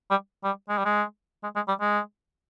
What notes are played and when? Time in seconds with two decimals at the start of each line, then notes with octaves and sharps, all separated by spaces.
0.10 G3
0.44 G3
0.69 G#3
0.77 G3
0.85 G#3
1.43 G#3
1.55 G#3
1.68 G3
1.80 G#3